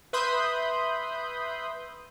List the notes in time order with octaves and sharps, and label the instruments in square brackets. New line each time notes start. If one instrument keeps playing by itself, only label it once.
[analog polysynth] B4 E5 B5 C6 D#6 G6